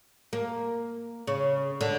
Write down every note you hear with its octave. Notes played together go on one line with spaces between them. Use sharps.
A#3
C#3
D3